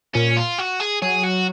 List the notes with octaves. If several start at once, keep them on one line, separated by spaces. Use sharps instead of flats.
A#2 C#4
F4
F#4
G#4
F#3 G#4
F#4